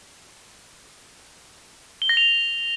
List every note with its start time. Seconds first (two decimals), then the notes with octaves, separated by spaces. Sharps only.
2.02 G7
2.09 A#6
2.17 F7